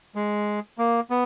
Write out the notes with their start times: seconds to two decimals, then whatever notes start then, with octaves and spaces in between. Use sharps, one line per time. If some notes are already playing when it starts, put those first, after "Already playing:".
0.15 G#3
0.78 A#3
1.10 B3